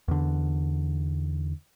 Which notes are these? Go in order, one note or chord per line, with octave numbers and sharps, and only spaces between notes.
E2 D3